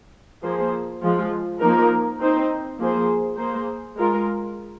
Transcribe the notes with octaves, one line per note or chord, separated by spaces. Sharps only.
F3 A#3 G#4 C5
F3 G#3 F4
F3 A#3 D#4 A#4
C4 D#4 C5
F3 A#3 G#4 C5
A#3 G#4 C5
G#3 F4 A#4